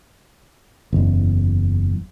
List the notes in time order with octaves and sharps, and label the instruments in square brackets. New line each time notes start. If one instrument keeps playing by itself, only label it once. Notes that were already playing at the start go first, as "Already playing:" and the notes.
[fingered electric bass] F#1 E2